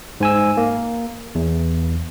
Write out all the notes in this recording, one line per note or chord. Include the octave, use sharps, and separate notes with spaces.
G#2 G#5 E6
A#3
E2